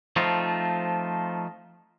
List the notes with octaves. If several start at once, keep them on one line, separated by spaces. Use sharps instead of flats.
F3 A3 C4 D#4 F4